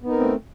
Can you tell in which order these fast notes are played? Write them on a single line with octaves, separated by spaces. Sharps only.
B3 D#4 A#4 C4 A3